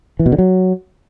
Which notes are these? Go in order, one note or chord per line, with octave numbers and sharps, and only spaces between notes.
E3
B2
D3
F#3